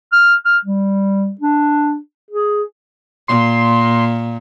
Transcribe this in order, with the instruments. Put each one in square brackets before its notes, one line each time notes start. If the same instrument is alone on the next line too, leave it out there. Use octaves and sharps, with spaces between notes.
[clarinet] F6
F6
G3
D4
G#4
[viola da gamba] A#2 [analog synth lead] C6